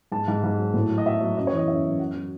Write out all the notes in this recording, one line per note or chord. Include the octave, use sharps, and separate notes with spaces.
G#2 A5
G#2
G#2
F#3
A2
F#3
D#5
F#3 E5
F#3
F#2 D#5
C#5
E3 D#5
F#2 E5
F#2
F#3 F#5
F#3